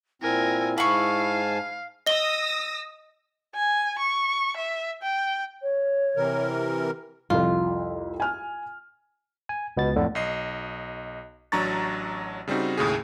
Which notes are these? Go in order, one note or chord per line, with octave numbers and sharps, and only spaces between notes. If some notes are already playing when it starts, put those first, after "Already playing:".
A#2 C4 E4 A#4 G#5
G#2 F5 G#5 A5 B5 C#6
D#5 D#6 E6 A#6 G7
G#5
C#6
E5
G5
C#5
C3 E3 A#4
C2 F2 F4 A4
G#5 F6
G#5
C#2 B2 B3 A6
F2 A2 D3
B1 D#5 C7
A1 F#3 D4 A#5 C#6 A6
C#3 G3 C4 D#4 F#4
D#2 A2 C#3 G#4